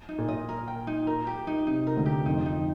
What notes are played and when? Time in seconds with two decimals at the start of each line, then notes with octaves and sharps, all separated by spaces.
0.09 D#4
0.18 A#2
0.28 D#5
0.49 A#4
0.68 G5
0.87 D#4
1.07 A#4
1.27 G4
1.47 D#4
1.67 C3 D#4
1.87 A#4
1.97 D2 D3
2.06 G4
2.26 F2 F3 D#4
2.46 D#4